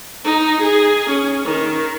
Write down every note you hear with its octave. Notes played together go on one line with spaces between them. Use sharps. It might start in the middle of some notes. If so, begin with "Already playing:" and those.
D#4
G#4
C#4
D#3